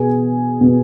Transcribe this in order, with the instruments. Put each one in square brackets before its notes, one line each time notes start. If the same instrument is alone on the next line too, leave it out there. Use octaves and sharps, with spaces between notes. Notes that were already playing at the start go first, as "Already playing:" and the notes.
Already playing: [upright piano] B2 B3 G#4 G#5
B2 B3